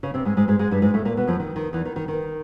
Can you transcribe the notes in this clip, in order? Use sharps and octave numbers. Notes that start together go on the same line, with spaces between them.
C#3 C#4
C3 C4
G#2 G#3
G#2 G#3
G#2 G#3
G#2 G#3
G2 G3
G#2 G#3
A2 A3
A#2 A#3
B2 B3
F2 F3
D#3
D#3
E2 E3
D#3
D#3
D#3